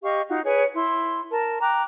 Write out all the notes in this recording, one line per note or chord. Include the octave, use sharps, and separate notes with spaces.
G4 D#5 F5 C#6
D#4 F4 F#4 F5
G#4 B4 C#5 G#5
E4 C6
A#4 A5
G5 A#5 D6 F#6